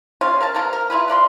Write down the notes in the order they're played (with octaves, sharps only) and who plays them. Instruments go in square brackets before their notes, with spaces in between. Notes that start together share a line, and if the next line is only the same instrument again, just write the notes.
[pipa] G3 G#3 C#4 F4
A#4 F5 A5
C3 E3 A#3 A#4
A#4
E4 F4 G#4 B4
F4 D5 A#5 C6